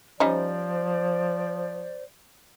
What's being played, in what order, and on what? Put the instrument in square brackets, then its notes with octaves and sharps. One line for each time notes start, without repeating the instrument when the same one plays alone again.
[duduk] F3 [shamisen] G3 C#4 D#4 [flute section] C5 D5